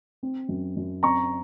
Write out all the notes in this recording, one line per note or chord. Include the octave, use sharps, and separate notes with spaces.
C4
F#2
F#2
C4 A#5 C#6